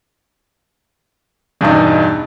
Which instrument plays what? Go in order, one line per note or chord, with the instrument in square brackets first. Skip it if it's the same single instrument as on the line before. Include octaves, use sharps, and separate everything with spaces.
[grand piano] E2 G2 B2 [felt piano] D4 D#4